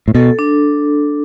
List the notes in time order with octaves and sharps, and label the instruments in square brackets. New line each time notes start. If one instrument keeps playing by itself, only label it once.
[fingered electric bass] A2
[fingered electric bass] B2 [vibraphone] A4
[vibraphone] D4